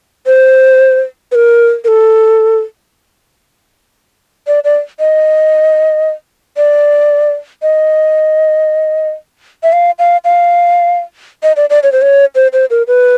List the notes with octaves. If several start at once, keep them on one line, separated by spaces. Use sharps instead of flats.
C5
B4
A#4
A#4
A4
D5
D5
D#5
D5
D#5
E5
F5
F5
F5
D#5
D5
D5
C#5
C5
C#5
C5
C5
A#4
B4